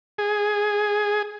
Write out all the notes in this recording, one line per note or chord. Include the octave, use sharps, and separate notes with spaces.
G#4